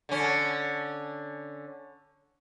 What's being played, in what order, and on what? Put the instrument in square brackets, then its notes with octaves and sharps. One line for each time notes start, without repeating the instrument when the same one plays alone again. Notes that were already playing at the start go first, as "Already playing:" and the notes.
[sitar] D3 C#4